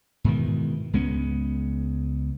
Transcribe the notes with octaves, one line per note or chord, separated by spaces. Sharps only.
G#2 B2 D#3 E3
C#2 G#3 B3 C#4